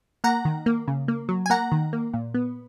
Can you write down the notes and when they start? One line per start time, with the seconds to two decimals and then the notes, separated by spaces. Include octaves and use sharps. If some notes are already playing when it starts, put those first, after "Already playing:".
0.24 A#3 F#5 A#5
0.45 D#3
0.66 A#3
0.88 C#3
1.08 A#3
1.29 F#3
1.46 G#5
1.50 A#3 F#5 A#5
1.72 D#3
1.93 A#3
2.13 A#2
2.34 B3